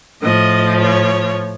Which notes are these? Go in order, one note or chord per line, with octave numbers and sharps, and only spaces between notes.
A2 F3 D#5
C#5